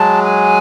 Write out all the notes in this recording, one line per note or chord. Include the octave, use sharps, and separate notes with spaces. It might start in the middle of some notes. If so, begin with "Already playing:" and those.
Already playing: F#3 G#3 A5
G#5